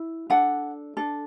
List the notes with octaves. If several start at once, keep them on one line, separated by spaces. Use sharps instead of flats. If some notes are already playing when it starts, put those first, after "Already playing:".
Already playing: E4
D4 A4 F#5
D4 A4